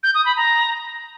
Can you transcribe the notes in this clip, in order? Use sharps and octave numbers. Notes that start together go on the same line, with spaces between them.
G6
D#6
B5
A#5